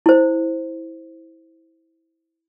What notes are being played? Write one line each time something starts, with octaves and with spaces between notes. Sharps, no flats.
E4 C5